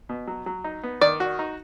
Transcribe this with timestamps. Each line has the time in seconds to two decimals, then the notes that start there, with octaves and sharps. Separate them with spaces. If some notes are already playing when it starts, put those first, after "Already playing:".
0.09 B2
0.27 F#3
0.46 F#3
0.64 D#4
0.83 B3
1.01 D#3 D5
1.20 F#4
1.39 D#4